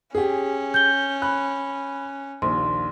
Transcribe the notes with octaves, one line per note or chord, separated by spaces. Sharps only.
C#4 G4 G#4
G6 G7
B5 F#6
A#1 D#2 C6